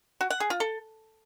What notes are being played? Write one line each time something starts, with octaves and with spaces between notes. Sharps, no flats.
F#4
F#5
G#4
F4
A4